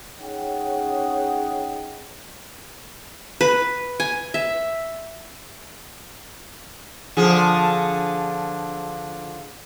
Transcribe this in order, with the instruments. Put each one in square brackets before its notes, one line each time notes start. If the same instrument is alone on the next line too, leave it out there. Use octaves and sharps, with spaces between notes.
[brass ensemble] C#4 D#4 G#4 C#5 F#5 G5
[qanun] B4
G#5
E5
[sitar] D3 F3 G#4